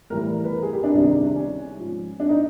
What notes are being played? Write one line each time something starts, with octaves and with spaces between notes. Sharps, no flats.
A2 E3 G3 A#4
B4
A#4
G#4
G4
D4
C2 C3 D#3 G3
C#4
G#2 F3
D4
D#4